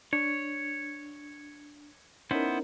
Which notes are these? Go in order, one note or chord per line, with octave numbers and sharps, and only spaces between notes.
D4 C#5
B3 C#4 D#4 E4 A#4 C5